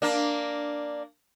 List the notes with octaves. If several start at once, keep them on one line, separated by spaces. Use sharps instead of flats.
A#3 D4